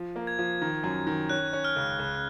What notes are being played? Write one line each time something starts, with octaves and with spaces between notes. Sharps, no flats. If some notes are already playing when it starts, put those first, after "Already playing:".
Already playing: F3
A#3
G#6
F3
D#3
F#2
D#3
C#4 F#6
C#4
F6
C#2
C#2